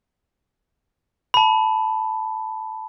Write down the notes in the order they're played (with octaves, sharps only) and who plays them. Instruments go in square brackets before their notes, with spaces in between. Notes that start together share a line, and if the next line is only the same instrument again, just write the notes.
[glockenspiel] A5 B5